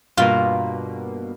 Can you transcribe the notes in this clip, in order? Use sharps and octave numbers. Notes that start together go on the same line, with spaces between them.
G2 B2 A#3 F4